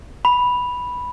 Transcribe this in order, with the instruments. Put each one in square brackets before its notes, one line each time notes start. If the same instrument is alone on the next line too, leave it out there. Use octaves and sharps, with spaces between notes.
[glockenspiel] B5